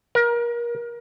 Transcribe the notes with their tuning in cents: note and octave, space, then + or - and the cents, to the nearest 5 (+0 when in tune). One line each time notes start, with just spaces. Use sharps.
A#4 +30